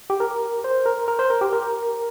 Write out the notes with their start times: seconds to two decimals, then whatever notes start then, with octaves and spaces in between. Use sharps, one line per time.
0.10 G4
0.20 A#4
0.64 C5
0.86 A#4
1.08 A#4
1.19 C5
1.30 A#4
1.41 G4
1.53 A#4